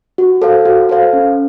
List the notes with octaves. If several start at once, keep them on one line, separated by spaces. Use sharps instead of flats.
F#4
A4 C5 F5
F#4
A4 C5 F5
C#4